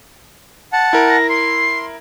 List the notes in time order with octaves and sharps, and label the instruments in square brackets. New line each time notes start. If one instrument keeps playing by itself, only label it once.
[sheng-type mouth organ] F#5 A5
[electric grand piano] E4 A#4
[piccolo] A#6
[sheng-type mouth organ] C6 [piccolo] C7